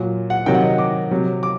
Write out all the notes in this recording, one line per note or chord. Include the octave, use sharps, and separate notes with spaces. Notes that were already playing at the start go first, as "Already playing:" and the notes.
Already playing: A#2 F#3
F#5
C3 D#3 F#3 G5
F#5
D#5
D6
C3 F#3
D6